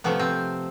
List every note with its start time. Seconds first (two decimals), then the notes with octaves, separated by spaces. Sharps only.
0.04 C3 F3 A3 B3
0.19 C4